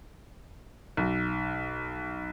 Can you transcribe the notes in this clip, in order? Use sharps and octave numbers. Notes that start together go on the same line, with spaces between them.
B1